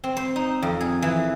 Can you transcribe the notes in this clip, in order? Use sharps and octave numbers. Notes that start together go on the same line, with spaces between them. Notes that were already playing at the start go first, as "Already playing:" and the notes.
C4
C5
D#4
F2
G#4
E3